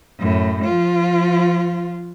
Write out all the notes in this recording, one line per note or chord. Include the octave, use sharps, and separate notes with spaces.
F#2 A2
F3 F4